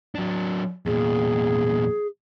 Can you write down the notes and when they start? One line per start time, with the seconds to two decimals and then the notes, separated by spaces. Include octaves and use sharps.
0.15 F#3 D4
0.86 E2 A#2 G#4